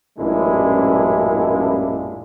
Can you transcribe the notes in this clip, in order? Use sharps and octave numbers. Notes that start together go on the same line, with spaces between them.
A1 F#2 A#2 G#3 D4 E4